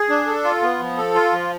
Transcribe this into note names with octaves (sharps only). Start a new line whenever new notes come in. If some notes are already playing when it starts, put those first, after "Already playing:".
Already playing: G#4
D4
A4
F4
B3
F3
A4
F4
F3